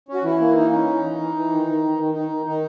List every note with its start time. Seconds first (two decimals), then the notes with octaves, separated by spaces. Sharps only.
0.09 C#4
0.14 F#4
0.24 E3 E4
0.40 A#3
0.56 E3 D#4
0.71 C#4
0.87 E3
1.03 E3
1.19 E3
1.36 E3
1.51 D#3
1.67 D#3
1.82 D#3
1.98 D#3
2.14 D#3 D#4
2.31 D#3
2.46 D#3 D#4